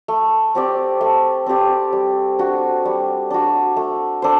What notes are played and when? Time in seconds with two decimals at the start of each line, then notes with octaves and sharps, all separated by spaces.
0.08 A3
0.55 C4 G4 D5
1.01 A3
1.46 C4 G4 D5
1.93 G3
2.39 D4 F#4
2.85 G3
3.30 D4 F#4
3.76 A3
4.22 D4 A4 C5